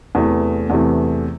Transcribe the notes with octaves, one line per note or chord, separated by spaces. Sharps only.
E2 C3 E3 A3
E2 C3 E3 A3